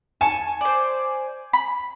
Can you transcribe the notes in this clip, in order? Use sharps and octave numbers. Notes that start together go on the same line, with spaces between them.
G#5 A5 C#6
C5 D5
B5